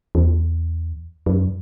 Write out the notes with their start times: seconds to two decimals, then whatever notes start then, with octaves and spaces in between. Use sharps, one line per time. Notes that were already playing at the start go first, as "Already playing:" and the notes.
0.15 E2
1.26 F#2